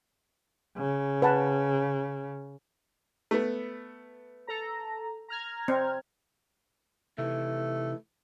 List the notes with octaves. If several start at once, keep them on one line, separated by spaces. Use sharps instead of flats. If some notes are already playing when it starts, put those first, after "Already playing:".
C#3
B4 F#5 A5
A3 B3
A4 A#5
A#5 F6 G#6
C4
C3 D#3 E3 A3